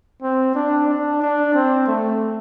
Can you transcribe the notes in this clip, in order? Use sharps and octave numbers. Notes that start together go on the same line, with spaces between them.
C4
D4
D4
D4
C4
A3